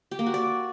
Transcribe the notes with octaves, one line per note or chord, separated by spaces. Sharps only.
G4
A#3
F#4
D5